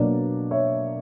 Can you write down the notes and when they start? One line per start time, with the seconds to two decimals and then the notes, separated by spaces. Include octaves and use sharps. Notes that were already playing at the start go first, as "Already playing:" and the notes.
Already playing: B2 F#3 A#3 D4 D5
0.51 C#5 E5